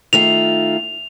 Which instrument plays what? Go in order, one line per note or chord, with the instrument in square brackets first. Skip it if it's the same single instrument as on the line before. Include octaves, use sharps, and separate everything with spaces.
[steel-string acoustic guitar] D#3 A3 F4 [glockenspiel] F7